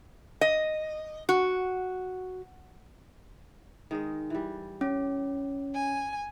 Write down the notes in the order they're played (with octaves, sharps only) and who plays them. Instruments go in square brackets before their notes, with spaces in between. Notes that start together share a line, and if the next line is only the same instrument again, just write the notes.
[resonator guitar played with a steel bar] D#5
F#4
[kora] D#3 G#3 D#5
E3 G3
[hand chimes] C#4
[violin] G#5